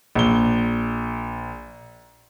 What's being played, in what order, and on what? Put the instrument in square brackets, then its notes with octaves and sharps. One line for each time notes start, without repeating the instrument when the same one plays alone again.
[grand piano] A#1 G7